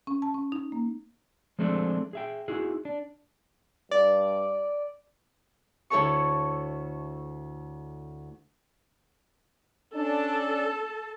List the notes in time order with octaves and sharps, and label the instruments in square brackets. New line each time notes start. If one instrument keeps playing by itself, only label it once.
[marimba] C#4
A5
C#4
D#4
A#3
[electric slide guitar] F3 G#3 A3 C4 D4 A4
G#4 E5 G5
D#4 E4 F#4 G#4
D4
[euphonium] G2 [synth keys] D5
[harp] D2 E4 A4 C#5 A5 C#6
[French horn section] C#4 D4 [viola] A4 A5